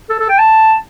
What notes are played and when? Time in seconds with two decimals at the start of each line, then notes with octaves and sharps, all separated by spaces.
0.10 A4
0.20 A4
0.29 G5
0.38 A5